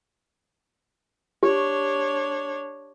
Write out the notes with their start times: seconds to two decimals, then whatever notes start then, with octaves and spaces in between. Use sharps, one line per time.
1.43 D4 G4 C#5